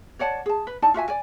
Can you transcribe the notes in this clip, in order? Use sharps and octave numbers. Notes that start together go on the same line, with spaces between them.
C#5 D5 F#5 A5
G#4 A5
B4
D#4 E4 D5 A5
F4 F#4 E5 G#5
D5 G#5